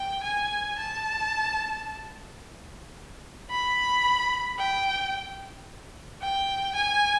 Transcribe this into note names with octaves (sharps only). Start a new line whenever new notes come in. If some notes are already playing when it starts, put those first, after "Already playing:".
Already playing: G5
G#5
A5
B5
G5
G5
G#5